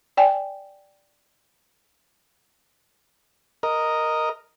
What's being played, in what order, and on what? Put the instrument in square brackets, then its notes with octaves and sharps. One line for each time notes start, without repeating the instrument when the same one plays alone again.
[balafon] D5 G5 G#5
[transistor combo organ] A#4 D#5